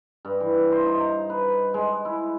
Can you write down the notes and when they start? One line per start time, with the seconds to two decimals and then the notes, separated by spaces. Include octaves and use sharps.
0.25 G2
0.40 E3
0.72 C5
0.86 D#4
1.00 A#5
1.30 B4
1.74 G#3
2.05 E4